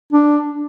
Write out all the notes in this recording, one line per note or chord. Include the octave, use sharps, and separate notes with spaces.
D4